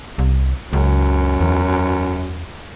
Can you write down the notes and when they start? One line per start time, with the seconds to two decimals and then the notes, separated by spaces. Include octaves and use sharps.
0.18 C2
0.73 C#2 F#2
1.41 E2